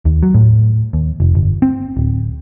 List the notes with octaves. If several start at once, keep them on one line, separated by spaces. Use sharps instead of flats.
D#2
F#3
A2
D#2
F1
G1
C4
D1